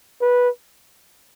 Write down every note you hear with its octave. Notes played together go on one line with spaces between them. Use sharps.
B4